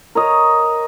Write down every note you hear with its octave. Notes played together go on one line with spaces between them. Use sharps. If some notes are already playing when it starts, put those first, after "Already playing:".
A#4 C#5 D#5